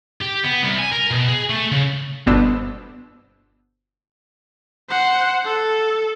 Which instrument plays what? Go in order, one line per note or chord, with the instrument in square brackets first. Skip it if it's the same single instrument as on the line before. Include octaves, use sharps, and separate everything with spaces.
[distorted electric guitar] G4
B3
C2
G#5
A#4
B2
G#4
A3
C#3
[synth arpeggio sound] G1 B2 B3 D4 C5 E6
[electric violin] C5 F#5
A4